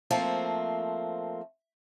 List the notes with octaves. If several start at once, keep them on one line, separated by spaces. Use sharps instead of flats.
F3 A3 A#3 C4